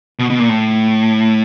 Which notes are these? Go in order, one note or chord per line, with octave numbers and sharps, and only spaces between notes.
B2
B2
A#2
A2